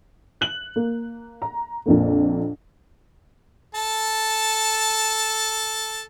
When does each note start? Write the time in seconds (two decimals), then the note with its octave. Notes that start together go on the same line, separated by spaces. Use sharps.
0.41 F#6 F#7
0.76 A#3
1.42 A#5
1.86 A#1 F2 A#3
3.75 A4 A5